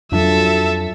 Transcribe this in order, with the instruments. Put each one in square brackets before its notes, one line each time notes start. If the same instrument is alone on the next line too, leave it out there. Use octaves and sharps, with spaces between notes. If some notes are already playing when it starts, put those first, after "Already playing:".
[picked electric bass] F2 D4 [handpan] F#3 F4 [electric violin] A4 E5